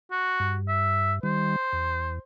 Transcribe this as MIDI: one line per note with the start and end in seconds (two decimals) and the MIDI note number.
0.11 0.56 66
0.40 1.19 43
0.68 1.13 76
1.23 1.56 51
1.23 1.56 55
1.23 2.21 72
1.72 2.19 40